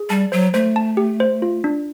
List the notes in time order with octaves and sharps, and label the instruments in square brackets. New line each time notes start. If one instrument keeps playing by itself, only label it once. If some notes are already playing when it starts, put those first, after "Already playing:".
Already playing: [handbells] G#4
[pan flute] G3 [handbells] A5
[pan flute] F#3 [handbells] C5
[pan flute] A3 [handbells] C5
[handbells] A5
G4
C5
F4
D4